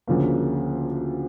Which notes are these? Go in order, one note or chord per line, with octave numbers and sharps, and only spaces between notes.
D2 C#3 F3 A#3